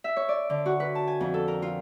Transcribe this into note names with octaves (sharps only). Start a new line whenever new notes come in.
E5
C#5
D5
D3
F#4
B4
A5
G#5
F2
A4
A#4
F4